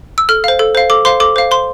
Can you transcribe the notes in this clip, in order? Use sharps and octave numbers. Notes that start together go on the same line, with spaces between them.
E6
A4 F6
C5 F5
A4
C5 F5
A4 D6
C5 F5 C6
A4 D6
C5 F5
C5 C6